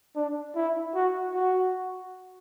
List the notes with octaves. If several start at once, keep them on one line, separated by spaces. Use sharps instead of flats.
D4
E4
F#4
F#4